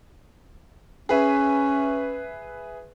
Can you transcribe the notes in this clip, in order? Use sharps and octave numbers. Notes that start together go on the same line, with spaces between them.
C#4 G#4 B4 E5